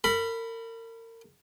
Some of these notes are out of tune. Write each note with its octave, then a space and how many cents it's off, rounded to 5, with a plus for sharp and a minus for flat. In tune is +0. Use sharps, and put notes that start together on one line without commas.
A#4 -35 B5 +0